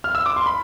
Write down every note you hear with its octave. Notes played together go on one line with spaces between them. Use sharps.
F6
E6
D6
C6
B5